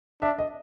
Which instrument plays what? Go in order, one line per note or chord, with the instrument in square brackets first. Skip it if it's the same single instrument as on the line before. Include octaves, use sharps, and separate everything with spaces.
[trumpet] D4 [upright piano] E5
[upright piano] D#5